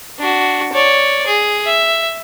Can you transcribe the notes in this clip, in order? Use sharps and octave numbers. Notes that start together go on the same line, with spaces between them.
D4 F#4
C#5 D5
G#4
E5